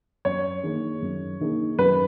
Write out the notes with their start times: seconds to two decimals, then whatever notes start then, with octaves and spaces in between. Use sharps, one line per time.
0.25 F#2 C#5
0.63 D#3 A#3 D#4 G#4
1.02 F#2
1.40 D#3 A#3 D#4 G#4
1.78 F#2 B4